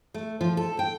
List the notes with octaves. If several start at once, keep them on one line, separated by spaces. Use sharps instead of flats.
A3
F3
A4
G5